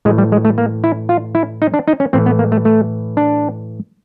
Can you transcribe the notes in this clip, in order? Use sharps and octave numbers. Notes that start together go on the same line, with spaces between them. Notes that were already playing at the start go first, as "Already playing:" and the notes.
A2 E3 G#3
G3
G#3
A3
A#3
E4
F4
E4
D#4
D4
D#4
C#4
A2 E3 C4
B3
A#3
A3
A3
D4